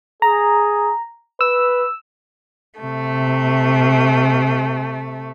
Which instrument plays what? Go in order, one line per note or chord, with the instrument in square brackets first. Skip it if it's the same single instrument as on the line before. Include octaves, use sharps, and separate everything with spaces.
[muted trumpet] G#4 [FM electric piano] A#5
[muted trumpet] B4 [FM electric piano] E6
[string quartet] C3 A3